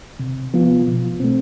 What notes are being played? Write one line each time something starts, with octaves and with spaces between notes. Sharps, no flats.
C3
F3 B3 F4
B2
A3 C4